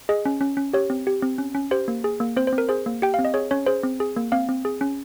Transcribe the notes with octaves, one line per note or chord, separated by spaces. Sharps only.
G#4 D#5
C#4
C#4
C#4
G4 C#5
C4
G4
C4
C#4
C#4
G4 C5
A#3
G#4
A#3
C4 C5
C5
C4
A#4
G#4 C5
A#3
G4 G5
C4 F5
D#5
G#4 C#5
C#4 C#5
G#4 C5
C4
G#4
A#3
C4 F5
C4
G#4
C#4